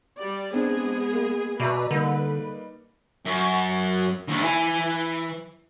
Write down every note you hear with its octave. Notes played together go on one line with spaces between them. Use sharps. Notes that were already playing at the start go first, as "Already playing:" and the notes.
G3 G4 D5
G#3 B3 C4 D4 G#4
A#3
B2 B4 D5 E5 A#5
D3 G3 A#3 D#4
F#2
D#2 D3
E3 G#5